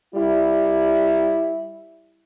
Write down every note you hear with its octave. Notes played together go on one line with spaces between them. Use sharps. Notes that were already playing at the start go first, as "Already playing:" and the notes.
G3 E4